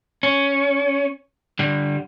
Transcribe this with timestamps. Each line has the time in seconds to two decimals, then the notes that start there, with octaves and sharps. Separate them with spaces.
0.23 C#4
1.59 D3 G3